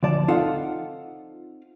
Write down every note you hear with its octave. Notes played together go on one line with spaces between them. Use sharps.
D2 F3 D5 A5
C4 D#4 F4 A4 F5 F#5